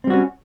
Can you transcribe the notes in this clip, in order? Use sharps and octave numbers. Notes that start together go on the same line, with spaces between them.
G3 C4 C#4 F#4